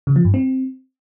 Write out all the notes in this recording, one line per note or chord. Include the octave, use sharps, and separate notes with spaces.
C#3
F3
G2
C4